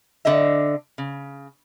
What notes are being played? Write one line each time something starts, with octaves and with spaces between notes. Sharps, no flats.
D3 D4 D#5 E5
C#3